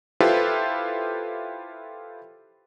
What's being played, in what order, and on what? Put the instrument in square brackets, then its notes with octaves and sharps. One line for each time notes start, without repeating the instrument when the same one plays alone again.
[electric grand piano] E4 F4 G4 A4 B4 C5